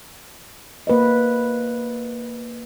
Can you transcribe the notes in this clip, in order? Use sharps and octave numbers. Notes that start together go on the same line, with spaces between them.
A#3 B4 C5 D#5